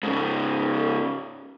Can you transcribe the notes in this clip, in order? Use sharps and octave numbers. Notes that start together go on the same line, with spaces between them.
G#2 C#3